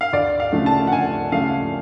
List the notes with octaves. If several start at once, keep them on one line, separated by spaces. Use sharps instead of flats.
F5
D2 D5
F5
C#3 F3 A3 D4
A5
F#5
D2 G#5
C#3 F3 A3 D4 F5